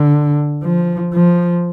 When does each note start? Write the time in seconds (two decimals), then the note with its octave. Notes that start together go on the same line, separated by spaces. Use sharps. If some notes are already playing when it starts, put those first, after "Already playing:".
Already playing: D3
0.63 F3
1.14 F3